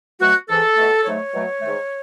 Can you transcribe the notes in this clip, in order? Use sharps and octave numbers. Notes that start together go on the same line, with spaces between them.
B2 F#3 A3 F#4
G#2 E3 G#3 A4
B2 A3
G#2 F#3 A3 C#5
B2 F#3 A3
G#2 D#3 A3